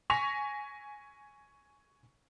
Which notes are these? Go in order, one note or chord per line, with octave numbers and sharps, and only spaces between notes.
G#5 C#6 A#6 B6 F7